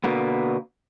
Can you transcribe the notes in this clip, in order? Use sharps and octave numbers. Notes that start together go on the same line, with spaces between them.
B2 D3 A#3 B3